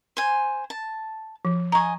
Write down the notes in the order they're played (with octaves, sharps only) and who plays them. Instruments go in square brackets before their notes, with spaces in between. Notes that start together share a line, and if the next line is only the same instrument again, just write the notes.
[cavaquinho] C5 G#5
A5
[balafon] F3
[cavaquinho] D#5 G#5 [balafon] A#5 C#6